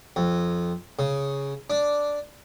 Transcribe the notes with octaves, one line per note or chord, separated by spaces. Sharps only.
F2
C#3
D4